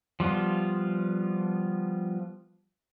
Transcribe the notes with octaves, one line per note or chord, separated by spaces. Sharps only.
F3 G3 B3 F4